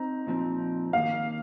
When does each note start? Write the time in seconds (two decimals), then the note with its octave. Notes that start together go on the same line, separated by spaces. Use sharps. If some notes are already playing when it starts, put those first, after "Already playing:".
Already playing: C4 D#4 A#5
0.27 A#2 F3 C4 D#4
0.93 D#3 A#3 D#4 F5